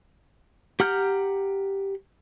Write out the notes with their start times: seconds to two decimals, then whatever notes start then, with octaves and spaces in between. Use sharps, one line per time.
0.80 G4 F#5 A#5 F6 G6